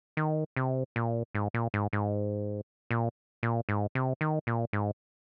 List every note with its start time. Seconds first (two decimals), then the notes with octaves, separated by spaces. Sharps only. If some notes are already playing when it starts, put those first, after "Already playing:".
0.17 D#3
0.56 C3
0.96 A#2
1.35 G#2
1.54 A#2
1.74 G#2
1.93 G#2
2.91 A#2
3.43 A#2
3.69 G#2
3.95 C3
4.21 D#3
4.47 A#2
4.73 G#2